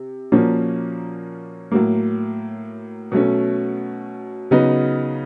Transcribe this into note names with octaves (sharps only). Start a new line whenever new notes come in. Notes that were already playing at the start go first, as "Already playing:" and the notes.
Already playing: C3
A#2 F3 A#3 C#4 F#4
A2 F#3 A#3
B2 F#3 A3 C#4
C#3 F#3 B3 D#4